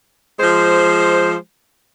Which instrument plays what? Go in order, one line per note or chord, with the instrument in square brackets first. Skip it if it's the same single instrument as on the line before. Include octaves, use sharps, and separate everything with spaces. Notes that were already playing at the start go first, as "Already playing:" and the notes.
[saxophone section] F3 G#3 C5